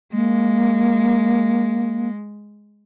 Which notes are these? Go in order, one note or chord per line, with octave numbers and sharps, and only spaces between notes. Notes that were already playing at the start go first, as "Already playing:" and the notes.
G#3 A#3